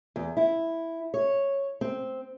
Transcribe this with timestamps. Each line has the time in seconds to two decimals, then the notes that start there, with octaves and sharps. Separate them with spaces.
0.16 E2
0.37 E4
1.14 C#5
1.81 C4